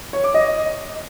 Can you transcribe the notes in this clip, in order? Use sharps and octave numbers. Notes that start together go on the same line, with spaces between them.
C#5
D6
D#5